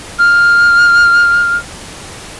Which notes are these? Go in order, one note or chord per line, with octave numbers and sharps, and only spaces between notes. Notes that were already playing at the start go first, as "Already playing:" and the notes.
F6